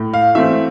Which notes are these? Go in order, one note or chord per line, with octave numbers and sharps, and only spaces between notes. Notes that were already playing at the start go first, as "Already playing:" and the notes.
Already playing: A2
F5
E3 A3 C4 E5